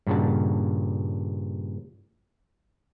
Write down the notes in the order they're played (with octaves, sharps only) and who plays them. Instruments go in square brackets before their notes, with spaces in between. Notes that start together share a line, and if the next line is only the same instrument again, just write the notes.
[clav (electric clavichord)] G2 A#2 C#3 F#5 A5